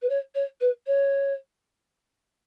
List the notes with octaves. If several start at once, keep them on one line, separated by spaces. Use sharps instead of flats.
B4
C#5
C#5
B4
C#5